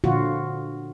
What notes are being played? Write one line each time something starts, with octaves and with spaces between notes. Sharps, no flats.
A#2 D3 F3 F4 F#4